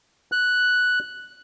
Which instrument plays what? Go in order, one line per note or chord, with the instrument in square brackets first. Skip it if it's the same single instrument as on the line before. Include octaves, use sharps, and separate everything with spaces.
[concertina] F#6